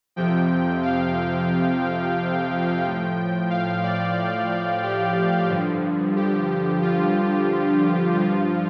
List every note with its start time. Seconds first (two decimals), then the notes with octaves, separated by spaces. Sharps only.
0.16 F2 C3 F3 G5
0.83 F5
2.83 A2 F3 G5
3.50 F5
3.83 D5
4.17 D5
4.83 G4
5.49 G2 D3 F3
6.16 G4
6.82 F4
8.15 G2 F3 F4